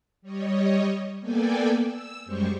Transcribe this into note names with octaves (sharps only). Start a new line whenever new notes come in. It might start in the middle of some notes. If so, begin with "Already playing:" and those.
G3 C#5 D#5
A#3 B3 A4 D5 G5 G#5
E6
F#2 G3 G#3 G4 C5 C#6